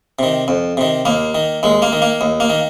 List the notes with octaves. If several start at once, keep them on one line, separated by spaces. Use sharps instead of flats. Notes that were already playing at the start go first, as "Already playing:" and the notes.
C3 D#3
F2
C3 D#3
D#2 A#3
D#3
D#2 G#3
A#3
D#3
A#3
D#2
A#3
D#3